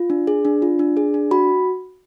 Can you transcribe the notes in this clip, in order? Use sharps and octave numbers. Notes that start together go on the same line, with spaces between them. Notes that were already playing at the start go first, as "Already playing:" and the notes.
Already playing: F4
D4
G#4
D4
F4
D4
G#4
D4
F#4 B5